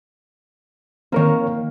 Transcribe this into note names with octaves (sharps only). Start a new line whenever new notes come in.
D#3 A#3 C4 A#4 C#5